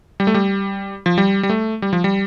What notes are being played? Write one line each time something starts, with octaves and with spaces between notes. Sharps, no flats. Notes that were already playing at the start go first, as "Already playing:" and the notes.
G3
A3
G3
F3
G3
G3
A3
G3
F3
G3